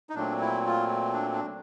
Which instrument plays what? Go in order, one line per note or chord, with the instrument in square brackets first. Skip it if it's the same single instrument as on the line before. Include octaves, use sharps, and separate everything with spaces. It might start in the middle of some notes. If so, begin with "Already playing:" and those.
[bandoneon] D#4
A#2 F#3 A3 C4 D4
E4
F4
D4
D4